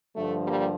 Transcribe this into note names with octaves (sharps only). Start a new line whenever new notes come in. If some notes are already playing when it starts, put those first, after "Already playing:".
G2 D3 F3 A3
G3 A#3